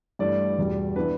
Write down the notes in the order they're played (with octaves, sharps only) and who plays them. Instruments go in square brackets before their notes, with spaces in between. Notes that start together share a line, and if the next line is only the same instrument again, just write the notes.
[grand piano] G2 E3 A3 D5
E2 B2 G3
E3 B3 D4 B4